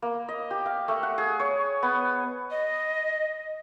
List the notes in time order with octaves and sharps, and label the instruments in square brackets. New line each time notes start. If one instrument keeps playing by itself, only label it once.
[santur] A#3
D#5
G4
F5
A3
F#5
G#4
C#5
B3
[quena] D#5